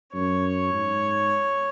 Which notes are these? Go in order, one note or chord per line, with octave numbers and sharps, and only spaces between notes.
F#2 C#5
G#2